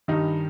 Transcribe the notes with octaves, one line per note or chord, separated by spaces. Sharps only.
G2 D#3 G3 D#4